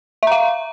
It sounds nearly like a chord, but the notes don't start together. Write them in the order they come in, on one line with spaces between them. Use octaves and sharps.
E5 A#5 F5